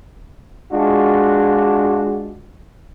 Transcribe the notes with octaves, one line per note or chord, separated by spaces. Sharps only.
G#3 D4 F4 F#4